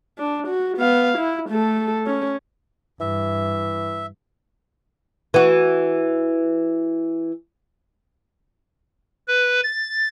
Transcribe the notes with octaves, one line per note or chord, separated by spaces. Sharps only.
D4
F#4
B3 F5
E4
A3 A4
C#4
G2 E3 E5
E3 F#4
B4
A6